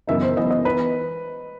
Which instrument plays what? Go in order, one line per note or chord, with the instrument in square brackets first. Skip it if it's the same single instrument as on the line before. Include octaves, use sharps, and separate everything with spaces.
[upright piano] F#1 F#2 E3 B3 D#4 [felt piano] E5
[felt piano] C5
[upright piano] F#1 F#2 E3 B3 D#4 [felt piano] D#5
[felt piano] D#5
[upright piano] E3 B3 D#4 [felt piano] B4